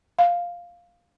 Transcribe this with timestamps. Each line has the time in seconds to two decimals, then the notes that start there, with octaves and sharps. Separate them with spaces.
0.19 F5